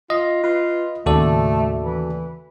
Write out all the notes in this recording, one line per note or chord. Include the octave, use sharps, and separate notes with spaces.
F4 D#5
F4 B4
D#2 A2 C#3 A3 F#4 A4 D5
E3